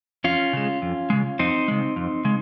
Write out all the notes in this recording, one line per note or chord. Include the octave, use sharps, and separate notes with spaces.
F2 C#4 F4
C#3 G#3
F2
C#3 G#3
F2 C4 D#4
C#3 G#3
F2
C#3 G#3